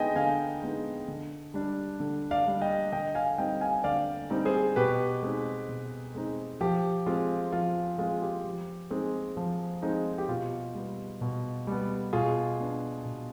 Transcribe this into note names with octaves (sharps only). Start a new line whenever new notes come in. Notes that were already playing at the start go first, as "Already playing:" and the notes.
Already playing: D3 G#3 B3 D#4 D#5 G5 G#5
D3 F5 G#5
G#3 B3 D#4
D3
G3 D4
D3
D5 F5
G3 D4
D#5 G5
D3 D#5 G5
F5 G#5
G3 C4 D#4 D#5 G5
F5 G#5
D3 D5 F5
G3 C4 D#4
G#4 C5
B2 G4 B4
G#3 C4 D#4
B2
G#3 C4 D#4
F3 G4
G#3 C4 F4
F3 F4
G#3 C4 F4
G4
F3
G#3 C4 D#4
F3
G#3 C4 D#4
G4
B2 F4
G3 B3
B2
G3 B3
B2 F4 G#4
B3 D4
B2